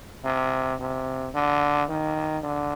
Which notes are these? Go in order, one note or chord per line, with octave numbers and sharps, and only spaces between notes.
C3
C3
D3
D#3
D3